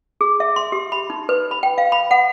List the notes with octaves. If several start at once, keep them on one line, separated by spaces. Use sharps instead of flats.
G#4
E5
C6
G4
B5
D#4
B4
B5
G5
F5
B5
F#5